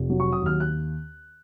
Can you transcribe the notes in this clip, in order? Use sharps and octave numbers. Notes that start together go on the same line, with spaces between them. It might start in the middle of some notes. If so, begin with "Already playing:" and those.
Already playing: F1
F#3
C#6
D#6
D#2 F6
F#6